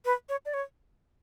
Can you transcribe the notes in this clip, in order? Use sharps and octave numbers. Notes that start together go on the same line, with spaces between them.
B4
C#5
D5
C#5